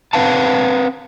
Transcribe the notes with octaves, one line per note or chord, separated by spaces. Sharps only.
C4 B4 F5 F#5 A5